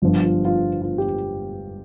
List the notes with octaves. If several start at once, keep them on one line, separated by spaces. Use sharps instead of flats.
G1 G2 F3 F4
F4
F4
F4
G4